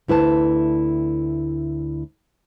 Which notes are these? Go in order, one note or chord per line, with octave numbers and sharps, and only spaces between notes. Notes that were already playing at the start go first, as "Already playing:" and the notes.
D2 E4 B4 A5